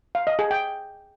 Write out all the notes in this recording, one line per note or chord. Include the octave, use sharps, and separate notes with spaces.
F5
D#5
G#4
G5